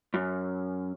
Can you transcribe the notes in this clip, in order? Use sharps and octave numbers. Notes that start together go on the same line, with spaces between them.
F#2